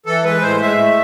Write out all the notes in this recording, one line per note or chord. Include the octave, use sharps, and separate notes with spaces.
E3 A4
G#3 B4
A2 C5
G#3 E5
A3